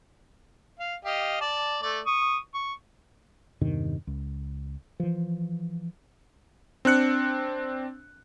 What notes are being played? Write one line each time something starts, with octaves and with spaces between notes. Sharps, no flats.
F5
G4 D#5 F5
D5 A5
A3 D5
C#6 D#6
C#6
E2 G2 C3 D#3
C#2
E3 F3
C4 D4 F#6 C#7